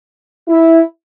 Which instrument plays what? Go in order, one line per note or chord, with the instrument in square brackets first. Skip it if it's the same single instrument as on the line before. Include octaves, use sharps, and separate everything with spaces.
[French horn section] E4